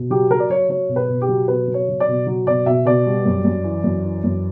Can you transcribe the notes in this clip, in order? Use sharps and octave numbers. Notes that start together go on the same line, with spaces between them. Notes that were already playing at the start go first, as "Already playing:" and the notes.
Already playing: B2
F#3 G4
F#3 A#4
D5
F#3 C#5
F#3 C#5
B2
B4
B2
G4
F#3
B2 B4
F#3
C#5
F#3
D5
B2
F#3
B2 D5
B2 E5
B2 D5
G3
F#2
F#2
E3
F#2
E3
F#2